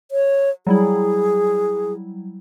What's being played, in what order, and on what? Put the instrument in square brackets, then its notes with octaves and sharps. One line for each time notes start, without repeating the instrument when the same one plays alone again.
[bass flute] C#5
[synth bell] F#3 G3 E4 [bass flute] G#4